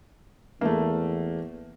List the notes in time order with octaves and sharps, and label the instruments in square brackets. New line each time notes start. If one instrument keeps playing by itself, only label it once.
[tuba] E2 [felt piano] A3 A#3